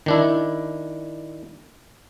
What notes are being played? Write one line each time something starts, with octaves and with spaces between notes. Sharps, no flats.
D#3 D4 E4